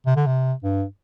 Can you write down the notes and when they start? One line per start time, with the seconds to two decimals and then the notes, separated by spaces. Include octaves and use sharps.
0.06 C3
0.16 D3
0.26 C3
0.63 G2